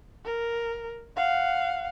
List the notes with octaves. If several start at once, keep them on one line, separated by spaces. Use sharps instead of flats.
A#4
F5 F#5